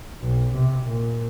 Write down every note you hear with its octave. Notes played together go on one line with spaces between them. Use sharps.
B1
C3
A#2